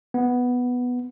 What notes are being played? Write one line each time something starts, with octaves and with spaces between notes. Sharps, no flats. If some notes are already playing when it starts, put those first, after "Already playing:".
B3